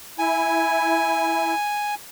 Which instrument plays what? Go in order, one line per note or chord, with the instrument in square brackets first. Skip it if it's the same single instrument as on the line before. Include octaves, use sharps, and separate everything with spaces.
[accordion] E4 [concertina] G#5